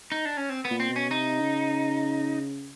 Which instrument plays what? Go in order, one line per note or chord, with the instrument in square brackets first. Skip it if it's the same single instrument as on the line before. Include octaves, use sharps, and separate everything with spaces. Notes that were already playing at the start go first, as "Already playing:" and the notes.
[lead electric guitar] D#4
D4
C#4
C4
B3
[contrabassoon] A#2
[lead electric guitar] C4
[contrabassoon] B2
[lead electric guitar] C#4
[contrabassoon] C3 [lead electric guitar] D#4
[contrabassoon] C#3